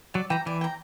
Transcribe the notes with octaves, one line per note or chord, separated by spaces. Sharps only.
F#3 D5
E3 G5 A#5
E3 D5
G5 A#5